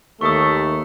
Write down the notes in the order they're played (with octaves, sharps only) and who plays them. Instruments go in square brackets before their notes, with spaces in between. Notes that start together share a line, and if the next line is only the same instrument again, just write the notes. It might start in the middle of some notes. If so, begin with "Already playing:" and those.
[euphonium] D#2 [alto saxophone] A3 [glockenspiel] C#6 D#6